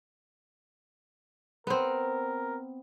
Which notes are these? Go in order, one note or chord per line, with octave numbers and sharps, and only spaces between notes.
B3 C4 A#4